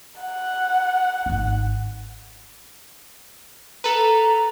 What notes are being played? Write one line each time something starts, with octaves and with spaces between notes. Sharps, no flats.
F#5
G#1 D#4
A4 B4 A#5